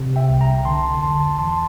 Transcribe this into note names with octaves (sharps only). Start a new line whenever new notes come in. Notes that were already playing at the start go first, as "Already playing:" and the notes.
Already playing: C3
E5 G5
C2
G5 A#5
D3 A5 C6
E2 A5 C6
E3 A5 C6